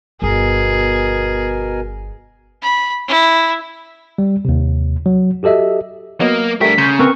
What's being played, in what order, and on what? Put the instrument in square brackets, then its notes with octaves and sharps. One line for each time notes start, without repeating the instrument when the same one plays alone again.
[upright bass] G1 D#4 [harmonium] B2 A#4 G#5 [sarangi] G#4
[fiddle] B5
E4
[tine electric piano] G3
D#2 C3
F#3
F#4 G4 A4 D#5 E5
[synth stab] F#3 B3 D#5 [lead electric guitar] A#3
[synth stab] G3 A3 [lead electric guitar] D4 A#4 [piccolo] B6
[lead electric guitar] C#3 [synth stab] A#5 C6 G6
[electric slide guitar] C4 A#4 B4 [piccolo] C#6